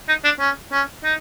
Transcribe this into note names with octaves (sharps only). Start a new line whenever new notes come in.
D#4
D4
C#4
C#4
D#4